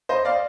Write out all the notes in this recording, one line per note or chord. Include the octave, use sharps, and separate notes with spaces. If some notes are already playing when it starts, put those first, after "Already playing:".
C5 D#5
D5 F5